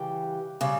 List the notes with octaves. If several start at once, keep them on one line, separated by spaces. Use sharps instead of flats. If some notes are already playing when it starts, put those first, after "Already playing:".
Already playing: C#3 E3 G3 G4
C#3 G3